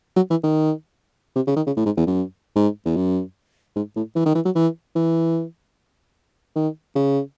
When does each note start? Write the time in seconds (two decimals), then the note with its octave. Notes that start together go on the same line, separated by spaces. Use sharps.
0.16 F#3
0.30 E3
0.43 D#3
1.36 C3
1.47 C#3
1.56 D#3
1.66 C#3
1.77 A2
1.86 G#2
1.97 E2
2.07 F#2
2.56 G#2
2.85 E2
2.96 F#2
3.76 G#2
3.96 A2
4.16 E3
4.26 D#3
4.35 E3
4.45 F#3
4.55 E3
4.96 E3
6.56 D#3
6.95 C#3